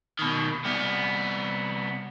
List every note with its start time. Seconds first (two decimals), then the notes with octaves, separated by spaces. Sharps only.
0.19 B2 D#3
0.65 C2 B3